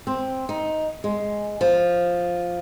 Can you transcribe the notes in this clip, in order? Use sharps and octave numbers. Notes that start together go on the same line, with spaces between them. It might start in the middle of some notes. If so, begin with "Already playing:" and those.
C4
D#4
G#3
F3